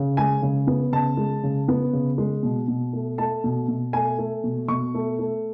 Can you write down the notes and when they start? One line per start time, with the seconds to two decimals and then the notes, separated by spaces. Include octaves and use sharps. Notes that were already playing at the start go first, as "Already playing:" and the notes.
Already playing: C#3
0.17 G#3 G#5
0.42 C#3
0.67 B3
0.92 C#3 A5
1.17 G#3
1.43 C#3
1.68 B3
1.93 C#3
2.18 G#3
2.43 B2
2.68 B2
2.93 A3
3.18 A3 A5
3.44 B2
3.68 B2
3.93 A3 G#5
4.18 A3
4.44 B2
4.68 B2 C#6
4.94 A3
5.19 A3